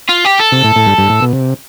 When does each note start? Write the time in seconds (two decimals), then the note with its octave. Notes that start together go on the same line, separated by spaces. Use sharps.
0.09 F4
0.25 G4
0.40 A4
0.52 C3
0.64 A2
0.76 A2
0.87 G2
0.98 G2
1.10 A2
1.22 B2
1.33 C3